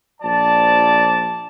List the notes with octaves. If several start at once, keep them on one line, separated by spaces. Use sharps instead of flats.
A#1 F3 D5 A5